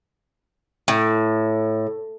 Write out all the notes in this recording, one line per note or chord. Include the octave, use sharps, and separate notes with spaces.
A2